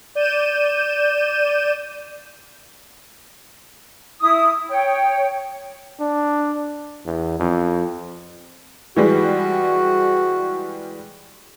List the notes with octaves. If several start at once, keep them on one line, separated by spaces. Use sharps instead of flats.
D5 G6 D#7 E7
E4 D#6
C#5 G5
D4
E2
F2
E3 G3 G#3 F#4